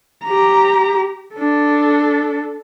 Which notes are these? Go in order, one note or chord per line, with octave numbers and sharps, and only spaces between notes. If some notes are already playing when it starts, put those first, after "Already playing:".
G4 A#5
D4 A4